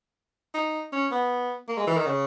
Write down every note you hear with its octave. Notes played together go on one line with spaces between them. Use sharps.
D#4
C#4
B3
A#3
G#3
E3
D#3
C#3